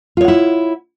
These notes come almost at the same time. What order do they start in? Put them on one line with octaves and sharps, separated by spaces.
F4 C#5 F#5 E4